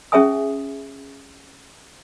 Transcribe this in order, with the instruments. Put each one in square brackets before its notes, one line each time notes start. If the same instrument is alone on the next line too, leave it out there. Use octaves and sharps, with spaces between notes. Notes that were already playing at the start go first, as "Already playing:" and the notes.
[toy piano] C#4 G#4 C#5 E5 G#5 D#6